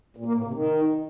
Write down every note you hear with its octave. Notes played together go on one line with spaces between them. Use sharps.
A#2
A#3
A2
C3
D#3